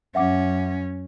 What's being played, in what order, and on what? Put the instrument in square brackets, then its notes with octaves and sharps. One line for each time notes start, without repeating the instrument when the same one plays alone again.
[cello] F#2 C#4 [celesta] E5 F#5 D6